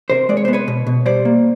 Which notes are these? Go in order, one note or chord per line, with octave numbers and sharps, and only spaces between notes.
C3 A#4 C5
G#3 D5
C#5
C5
B3
B4 C#5
B2
B2
G3 C5 D5
A#3